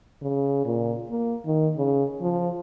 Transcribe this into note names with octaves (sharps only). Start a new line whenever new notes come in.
C#3
A#2
A#3
D#3
C#3
F3